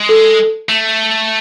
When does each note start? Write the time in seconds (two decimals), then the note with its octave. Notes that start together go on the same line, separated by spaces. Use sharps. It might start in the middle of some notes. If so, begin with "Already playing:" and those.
Already playing: G#3
0.09 A4
0.69 A3